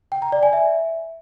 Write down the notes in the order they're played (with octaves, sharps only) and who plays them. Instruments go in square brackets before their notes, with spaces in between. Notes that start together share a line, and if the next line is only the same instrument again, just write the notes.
[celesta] G5
A#5
D5
G#5
E5